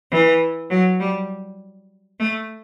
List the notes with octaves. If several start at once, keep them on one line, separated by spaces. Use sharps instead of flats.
E3
F#3
G3
A3